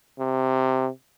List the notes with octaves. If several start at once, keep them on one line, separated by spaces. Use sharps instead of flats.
C3